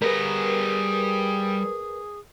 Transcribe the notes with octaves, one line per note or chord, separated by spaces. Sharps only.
G3 G#4 A#4 B4 A#5